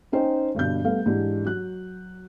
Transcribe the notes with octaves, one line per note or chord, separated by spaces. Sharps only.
C#4 D#4 C5 G5
G1 G2 B2 G6
G3 A3 B3 F5
G#2 E3 D4 G4
F#3 F#6